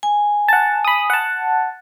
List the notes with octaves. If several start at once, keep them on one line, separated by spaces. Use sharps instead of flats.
G#5
F#5 A5
B5 D#6
F#5 A5